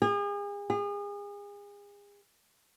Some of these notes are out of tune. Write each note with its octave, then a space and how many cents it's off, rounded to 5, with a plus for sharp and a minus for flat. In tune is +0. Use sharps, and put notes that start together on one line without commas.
G#4 -40
G#4 -35